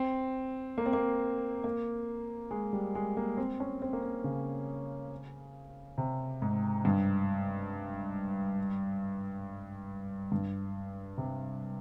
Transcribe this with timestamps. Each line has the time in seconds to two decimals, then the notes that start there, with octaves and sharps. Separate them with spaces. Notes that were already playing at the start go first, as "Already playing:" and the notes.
Already playing: C4
0.78 A#3
0.86 C4
0.93 A#3
1.64 A#3
2.51 G#3
2.73 G3
2.95 G#3
3.17 A#3
3.37 C4
3.60 C#4
3.82 C4
3.93 A#3
4.03 C4
4.24 C#3
5.98 C3
6.42 G#2
6.85 G2
10.32 G2
11.18 C3